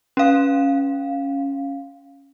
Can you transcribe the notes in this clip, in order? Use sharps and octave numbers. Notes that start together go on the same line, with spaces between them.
C#4 F5